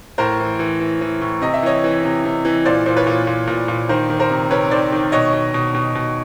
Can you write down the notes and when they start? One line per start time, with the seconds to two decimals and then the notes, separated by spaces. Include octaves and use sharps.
0.18 A2 A#4 C5
0.40 E3
0.59 E3
0.80 E3
1.01 E3
1.21 A2
1.41 C3 D#5
1.54 E5
1.63 E3 C#5 D#5
1.84 E3
2.04 C3
2.25 C3
2.45 E3
2.65 A#2 C5 D5
2.86 A#2 C5
2.97 B4 C#5
3.07 A#2
3.27 A#2
3.47 A#2
3.68 A#2
3.89 D#3 A#4 C5
4.10 D#3
4.20 A#4 C5
4.30 C3
4.51 C3 B4 C#5
4.71 D#3 C5 D5
4.92 D#3
5.12 B2 C#5 D#5
5.33 B2
5.54 B2
5.74 B2
5.95 B2